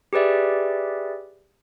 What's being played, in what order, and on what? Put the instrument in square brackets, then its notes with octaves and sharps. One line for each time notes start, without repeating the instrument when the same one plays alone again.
[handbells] G4 G#4 B4 D5 E5